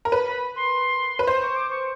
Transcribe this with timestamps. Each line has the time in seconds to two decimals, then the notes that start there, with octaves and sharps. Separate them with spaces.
0.05 A#4
0.12 B4 B5
0.26 B5
0.56 C6
1.19 B4
1.27 C5 C6
1.42 C#6
1.56 D6
1.71 C#6